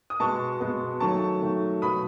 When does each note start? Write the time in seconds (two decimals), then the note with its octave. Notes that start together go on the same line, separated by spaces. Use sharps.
0.10 D#6
0.20 B2 G#3 B3 A5 C#6
0.60 B2 G#3 B3
1.00 D#3 F#3 A3 A5 C#6
1.42 D#3 F#3 A3
1.82 B2 F#3 B3 B5 D#6